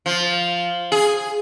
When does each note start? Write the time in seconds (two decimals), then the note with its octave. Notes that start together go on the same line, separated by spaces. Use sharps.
0.06 F3
0.92 G#4